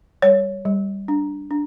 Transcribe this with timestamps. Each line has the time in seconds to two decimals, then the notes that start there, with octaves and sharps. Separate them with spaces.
0.22 G3 C#5
0.65 G3
1.08 D4
1.51 D4